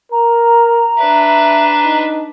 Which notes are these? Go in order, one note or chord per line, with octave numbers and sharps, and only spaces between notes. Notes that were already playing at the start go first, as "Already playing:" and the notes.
A#4 A#5
D4 B4 E5
D#4